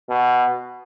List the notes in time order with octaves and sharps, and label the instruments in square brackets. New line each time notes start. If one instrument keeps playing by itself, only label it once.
[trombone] B2